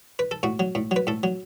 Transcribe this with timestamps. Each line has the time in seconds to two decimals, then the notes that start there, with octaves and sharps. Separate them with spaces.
0.19 B4
0.31 A4
0.43 A2 F#4
0.60 F#3
0.75 A2
0.91 F#3 B4
1.07 A2 A4
1.23 F#3